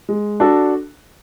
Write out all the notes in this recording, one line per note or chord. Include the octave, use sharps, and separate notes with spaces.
G#3
D4 F#4 A4